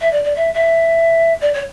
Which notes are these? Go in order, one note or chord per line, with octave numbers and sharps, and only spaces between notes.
E5
D5
D5
E5
E5
D5
C#5